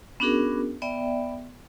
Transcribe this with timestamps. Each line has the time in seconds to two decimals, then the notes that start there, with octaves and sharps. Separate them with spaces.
0.20 B3 C#4 D4 F#4 G#4 A#4
0.82 B3 D5 E5 G5